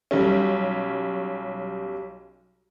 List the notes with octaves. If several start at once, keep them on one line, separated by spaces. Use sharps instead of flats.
B1 G3 C#4